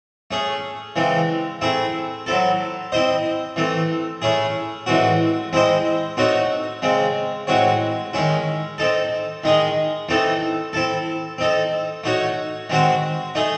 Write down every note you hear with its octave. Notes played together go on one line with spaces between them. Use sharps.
A3 C#4 G#4
C#3 E3 G#3 C4
A3 C4 E4 G#4
F#3 C4 E4 A4
C4 E4 C5 D#5
E3 A3 C4
A3 C#4 E4 G#4
A2 E3 G#3 C4 F#4
G#3 C4 E4 C5 D#5
A3 C4 D#4 F#4 C#5
C#3 G#3 C4
A2 G#3 C4 F#4 C#5
D#3 G#3 C#4 E4
C4 D#4 A4
D#3 G#3 D#4 G#4 D#5
E3 A3 C4 D#4 A4
C4 E4 A4
C4 D#4 A4
A3 D#4 F#4 C#5
D#3 G#3 C4 F#4 C5
A3 D#4 G#4 D#5